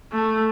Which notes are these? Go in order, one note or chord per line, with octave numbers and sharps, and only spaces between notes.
A3